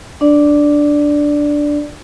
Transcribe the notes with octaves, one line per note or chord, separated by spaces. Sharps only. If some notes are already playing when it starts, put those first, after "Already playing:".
D4 D5